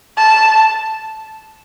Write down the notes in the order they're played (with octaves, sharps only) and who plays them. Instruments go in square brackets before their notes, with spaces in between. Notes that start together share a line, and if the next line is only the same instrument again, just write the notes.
[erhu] A5